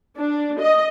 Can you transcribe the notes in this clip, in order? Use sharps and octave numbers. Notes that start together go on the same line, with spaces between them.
D4
D#5